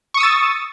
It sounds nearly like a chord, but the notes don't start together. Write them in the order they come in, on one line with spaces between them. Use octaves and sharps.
C#6 D#6 E6 A6